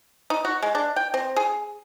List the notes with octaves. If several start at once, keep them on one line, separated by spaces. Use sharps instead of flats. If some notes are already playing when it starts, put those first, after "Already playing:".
D#4
F#4
G#3
D4
G5
C4
G#4